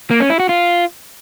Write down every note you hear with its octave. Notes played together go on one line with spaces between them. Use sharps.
A#3
C#4
E4
F#4
F4